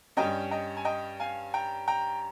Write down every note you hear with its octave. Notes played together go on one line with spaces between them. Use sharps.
G2 G3 C#4 D#5 G5
D#5 G5
G#5
D#5 G5
F5 G#5
G5 A#5
G5 A#5